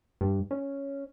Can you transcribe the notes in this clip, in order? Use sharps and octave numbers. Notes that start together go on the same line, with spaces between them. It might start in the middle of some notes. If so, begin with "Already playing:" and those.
G2
C#4